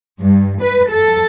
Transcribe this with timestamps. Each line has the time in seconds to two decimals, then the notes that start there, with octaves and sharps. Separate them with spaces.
0.21 G2
0.61 B4
0.92 A4